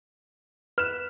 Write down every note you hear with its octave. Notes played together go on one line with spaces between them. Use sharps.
B4 F6 E7